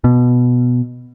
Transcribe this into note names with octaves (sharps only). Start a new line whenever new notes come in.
B2